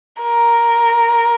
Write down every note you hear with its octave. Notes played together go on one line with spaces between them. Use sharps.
A#4